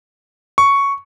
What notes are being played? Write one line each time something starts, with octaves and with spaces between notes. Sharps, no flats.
C#6